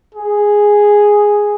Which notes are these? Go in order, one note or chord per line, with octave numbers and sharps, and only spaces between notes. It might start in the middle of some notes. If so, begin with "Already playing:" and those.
G#4